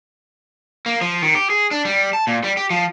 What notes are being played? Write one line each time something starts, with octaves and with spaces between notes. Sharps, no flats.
A#3
F3
D#3
G4
G#4
D4
G3
A5
A#2
G3
G4
F3